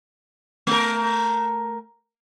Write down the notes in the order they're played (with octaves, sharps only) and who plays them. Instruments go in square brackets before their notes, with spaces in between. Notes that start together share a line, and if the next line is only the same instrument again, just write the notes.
[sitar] A3 A#4